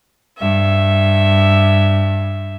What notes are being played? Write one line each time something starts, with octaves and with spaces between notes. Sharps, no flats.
G2 E5